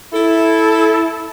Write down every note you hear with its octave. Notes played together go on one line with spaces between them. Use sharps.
E4 A4